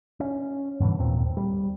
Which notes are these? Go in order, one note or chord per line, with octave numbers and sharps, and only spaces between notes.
C#4
G2 B2 D3 E3
E1 D#2 A#2 C4
G3